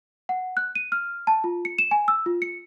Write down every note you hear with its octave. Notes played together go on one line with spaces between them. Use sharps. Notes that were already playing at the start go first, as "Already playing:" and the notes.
F#5
F#6
D#7
F6
A5
F4
C#7
E7
G#5
E6
F4
C#7